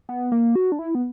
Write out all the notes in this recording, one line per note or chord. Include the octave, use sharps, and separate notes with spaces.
B3
A#3
F#4
D4
E4
B3